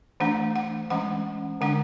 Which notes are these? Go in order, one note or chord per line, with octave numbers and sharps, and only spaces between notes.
E3 A3 D4 F#5
F#5
E3 G#3 C#4 F#5
D3 G#3 D4 F#5